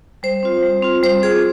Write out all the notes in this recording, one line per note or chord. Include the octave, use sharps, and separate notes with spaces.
G3 C5
C4 F4
G3
C4 F4
G3 C5
C4 F4 G#4